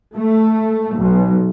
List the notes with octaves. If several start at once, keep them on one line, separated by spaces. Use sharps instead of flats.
A3
B1